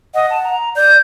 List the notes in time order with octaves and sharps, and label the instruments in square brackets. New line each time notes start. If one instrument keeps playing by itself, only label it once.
[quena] D#5 [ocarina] F#5
[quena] A5
A#5
[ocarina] D5 [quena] G6